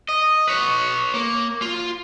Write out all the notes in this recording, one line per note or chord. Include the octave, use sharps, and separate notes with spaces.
D#5
B4 C#5
A#3
F4